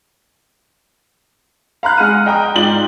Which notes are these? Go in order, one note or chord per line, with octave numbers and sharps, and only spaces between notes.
F5 A#5 B5 F#6
G#3 F#5 F6 D#7
D#5 G5 A#5 D#6
G#2 F4 D5 G5 F#7